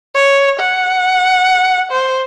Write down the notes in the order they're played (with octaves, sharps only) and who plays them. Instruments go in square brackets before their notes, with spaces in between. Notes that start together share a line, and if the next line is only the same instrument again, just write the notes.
[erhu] C#5
F#5
C5